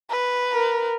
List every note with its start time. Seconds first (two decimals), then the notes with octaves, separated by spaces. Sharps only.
0.10 B4
0.53 A#4